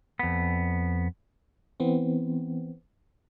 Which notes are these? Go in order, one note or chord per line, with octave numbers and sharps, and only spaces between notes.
F2 B3
E3 B3 C4